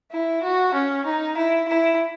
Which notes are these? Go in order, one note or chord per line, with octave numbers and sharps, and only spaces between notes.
E4
F#4
C#4
D#4
E4
E4